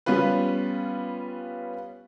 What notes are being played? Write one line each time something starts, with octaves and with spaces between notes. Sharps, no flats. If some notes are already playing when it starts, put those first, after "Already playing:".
G3 B3 C#4 F4 B4